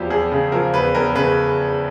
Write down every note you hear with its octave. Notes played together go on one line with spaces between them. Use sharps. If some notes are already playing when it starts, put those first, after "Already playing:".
Already playing: E2 F3 G4
E2 G#4
C#3
F3 A#4
E2 B4
E2 A#4
C#3 B4